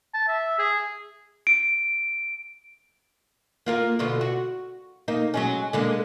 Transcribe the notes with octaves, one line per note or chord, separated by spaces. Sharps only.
A5
E5
G#4
D7
A#3 F4 A#4
B2 D3 F4
F#4
A#3 D#4
F#3 G#3 C#4
D3 G#3 A#3